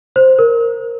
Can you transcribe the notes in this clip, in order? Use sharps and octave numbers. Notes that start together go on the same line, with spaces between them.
C5
A#4